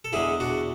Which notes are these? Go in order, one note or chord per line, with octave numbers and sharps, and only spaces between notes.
A4
E2 D3 G#3 E4 G#4
D4 F#4